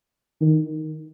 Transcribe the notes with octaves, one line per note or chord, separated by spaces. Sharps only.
D#3